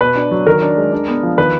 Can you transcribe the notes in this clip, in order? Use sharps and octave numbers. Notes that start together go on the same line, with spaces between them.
B2 B4
D4
F#3
D#3 A#4
D4
G#3
D4
B3
F3
D#3 B4